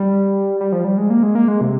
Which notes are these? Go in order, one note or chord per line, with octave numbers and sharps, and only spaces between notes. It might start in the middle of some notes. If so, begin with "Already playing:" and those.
Already playing: G3
G3
F3
G3
G#3
A#3
G#3
A#3
G#3
C3